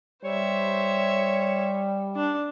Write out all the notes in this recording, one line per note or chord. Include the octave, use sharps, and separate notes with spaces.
G3 C5 C#5 E5
D4